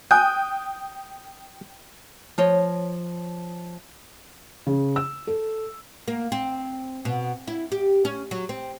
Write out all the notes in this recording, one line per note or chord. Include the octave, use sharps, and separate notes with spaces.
G5 G#5 D#6 F#6 G6
F3 C#5 D#5
C#3
E6
A4
A#3
C4
B2
E4
G4
C#4
F#3
C4